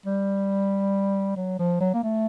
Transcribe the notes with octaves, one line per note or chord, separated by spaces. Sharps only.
G3
F#3
F3
F#3
A#3
A3